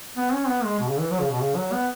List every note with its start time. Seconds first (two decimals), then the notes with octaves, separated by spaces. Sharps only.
0.17 B3
0.34 C#4
0.48 B3
0.64 G#3
0.80 B2
0.89 C#3
1.00 E3
1.11 F#3
1.21 C#3
1.31 B2
1.41 C#3
1.56 F#3
1.72 B3